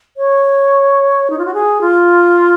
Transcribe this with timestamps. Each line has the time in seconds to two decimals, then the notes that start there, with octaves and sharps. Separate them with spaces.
0.17 C#5
1.30 D#4
1.39 F4
1.46 F#4
1.54 G#4
1.81 F4